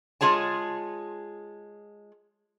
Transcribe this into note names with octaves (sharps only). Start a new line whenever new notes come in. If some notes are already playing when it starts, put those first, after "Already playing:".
G#3 F4 G#4 C#5 A5